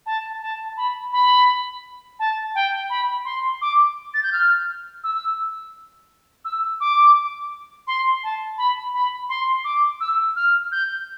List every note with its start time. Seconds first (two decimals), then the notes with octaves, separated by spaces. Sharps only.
0.06 A5
0.42 A5
0.77 B5
1.13 B5
2.19 A5
2.55 G5
2.90 B5
3.25 C6
3.61 D6
4.14 A6
4.23 G6
4.33 F6
5.04 E6
6.45 E6
6.80 D6
7.87 C6
8.23 A5
8.58 B5
8.94 B5
9.29 C6
9.64 D6
10.00 E6
10.36 F6
10.72 G6